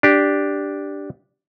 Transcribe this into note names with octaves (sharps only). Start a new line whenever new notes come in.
D4 G4